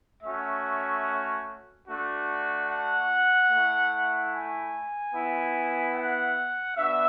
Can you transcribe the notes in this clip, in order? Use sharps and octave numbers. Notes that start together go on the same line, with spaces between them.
A3 C#4 F#4 E5
A3 D4 F#4
F#5
A3 E4
G#5
B3 E4
F#5
B3 D4 F#4 E5